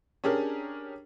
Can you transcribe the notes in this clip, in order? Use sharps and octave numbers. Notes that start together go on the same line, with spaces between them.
C#4 D4 G4 G#4 A#4